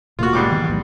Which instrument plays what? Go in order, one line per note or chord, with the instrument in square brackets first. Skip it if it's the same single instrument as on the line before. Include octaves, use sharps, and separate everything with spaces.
[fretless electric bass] E1 B2 A#3 [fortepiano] F4 F#4
[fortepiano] G#2 G3 D6
[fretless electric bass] D#3 E3 B3
B1 F#2 A2